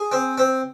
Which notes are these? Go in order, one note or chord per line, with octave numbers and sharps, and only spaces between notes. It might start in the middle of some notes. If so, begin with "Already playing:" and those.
Already playing: G#4
C4
C4